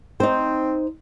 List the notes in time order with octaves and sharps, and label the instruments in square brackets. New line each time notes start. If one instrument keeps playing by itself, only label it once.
[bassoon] C4 [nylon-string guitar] D#4 C5